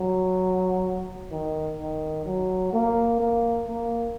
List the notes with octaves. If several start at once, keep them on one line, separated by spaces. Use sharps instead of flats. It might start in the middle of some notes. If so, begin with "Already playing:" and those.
Already playing: F#3
D#3
D#3
F#3
A#3
A#3
A#3